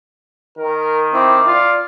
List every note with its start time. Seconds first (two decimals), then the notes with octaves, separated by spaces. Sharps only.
0.58 D#3 A#4
1.14 C4 E4 D6
1.47 F4 D5